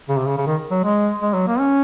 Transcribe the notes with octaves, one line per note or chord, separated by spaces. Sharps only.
C#3
C3
C#3
C#3
D#3
F#3
G#3
G#3
F#3
A#3
C#4